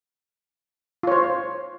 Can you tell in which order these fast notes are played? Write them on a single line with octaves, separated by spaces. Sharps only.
F4 C#5 C5